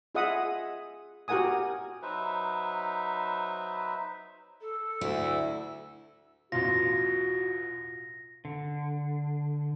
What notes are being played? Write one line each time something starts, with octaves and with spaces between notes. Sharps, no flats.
F4 G#4 D#5 E5 F#5 D#6
F#4 G4 A#4 F#5 G#5 D#6
F#3 D#4 B4 C5 E5
A4
D2 E4
A1 E2 B2 F4 F#4 A#6
D3